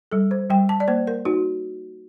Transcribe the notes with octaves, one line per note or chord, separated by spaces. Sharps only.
G3 A4
C5
G3 G5
A5
D5
A#3 C5
A#4
D#4 F#4